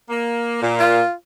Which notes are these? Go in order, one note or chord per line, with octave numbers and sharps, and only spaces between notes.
A#3
A#2
F4